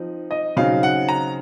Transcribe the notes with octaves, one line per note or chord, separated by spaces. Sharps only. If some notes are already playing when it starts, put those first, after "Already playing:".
Already playing: F3 C4 D#4
D#5
C#3 F#3 C4 D#4 F5
F#5
A#5